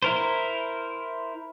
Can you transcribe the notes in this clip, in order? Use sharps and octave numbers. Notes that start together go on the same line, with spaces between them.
E4 A#4 C5